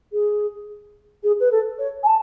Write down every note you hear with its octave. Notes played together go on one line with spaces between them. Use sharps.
G#4
G#4
B4
A4
C#5
G#5
A5